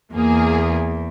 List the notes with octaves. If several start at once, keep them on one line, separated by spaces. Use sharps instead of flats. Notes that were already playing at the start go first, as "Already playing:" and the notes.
E2 A#3 G#4